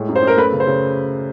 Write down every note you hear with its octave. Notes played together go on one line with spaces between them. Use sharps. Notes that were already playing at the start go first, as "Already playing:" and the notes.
Already playing: A2 G#3
F#2
C5
F#2
A#4
A3 B4
C#3
C5
C#3